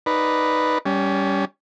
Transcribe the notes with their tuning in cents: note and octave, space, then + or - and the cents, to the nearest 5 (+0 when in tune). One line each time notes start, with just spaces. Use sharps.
D#4 +0 B4 +0 D5 +0
G3 +0 C#4 +20